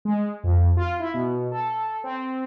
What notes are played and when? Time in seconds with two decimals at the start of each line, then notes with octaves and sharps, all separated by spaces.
0.05 G#3
0.44 F2
0.77 F4
1.00 E4
1.14 B2
1.52 A4
2.04 C4